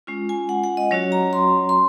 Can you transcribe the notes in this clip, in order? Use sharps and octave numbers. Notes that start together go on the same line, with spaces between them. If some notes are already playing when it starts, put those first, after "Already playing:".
G#3 C#4 F4
G#5
F#5
F#5
D#5
F#3 C#4 F#4 C#5
A#5
C6
C6